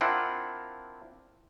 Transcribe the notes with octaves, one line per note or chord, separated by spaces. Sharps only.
C4 D4 E4 F4 A#4 F#5